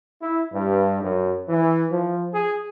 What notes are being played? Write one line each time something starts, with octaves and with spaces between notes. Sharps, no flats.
E4
G2
F#2
E3
F3
G#4